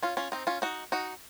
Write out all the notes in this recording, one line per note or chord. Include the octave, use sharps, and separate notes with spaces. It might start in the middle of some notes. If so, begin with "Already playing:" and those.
C#4 F4
C#4 F4
C4 D#4
C#4 F4
D#4 F#4
D#4 F#4